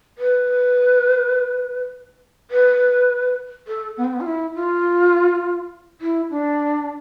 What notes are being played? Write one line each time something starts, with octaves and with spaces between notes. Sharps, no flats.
B4
B4
A4
B3
C4
B3
F4
E4
F4
E4
D4